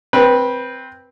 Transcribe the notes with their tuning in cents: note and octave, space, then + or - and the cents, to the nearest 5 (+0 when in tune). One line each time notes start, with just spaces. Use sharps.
C4 +0 B4 -20